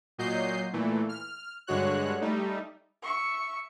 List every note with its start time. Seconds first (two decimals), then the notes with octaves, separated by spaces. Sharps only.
0.18 A#2 F#3 D#5 G6 C7
0.73 A#2 E3 A3
1.09 F6
1.67 G2 D3 G#3 F#4 C#5 F#6
2.21 G3 A3 D#4
3.03 E5 C#6